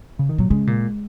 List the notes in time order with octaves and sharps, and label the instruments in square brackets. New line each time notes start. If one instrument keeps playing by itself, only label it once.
[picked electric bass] C#3
D#3
[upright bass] A#2 [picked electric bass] F#3
[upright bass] C#3 [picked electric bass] G#3
[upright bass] A#2